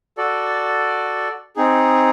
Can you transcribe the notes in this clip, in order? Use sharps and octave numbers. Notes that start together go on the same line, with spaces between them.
F#4 A4 D5
C4 D#4 G#4